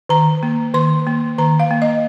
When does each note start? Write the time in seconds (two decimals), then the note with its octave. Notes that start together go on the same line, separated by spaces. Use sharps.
0.09 D#3 A#5
0.43 A#3
0.74 D#3 C6
1.07 A#3
1.38 D#3 A#5
1.60 F5
1.70 A#3
1.82 D#5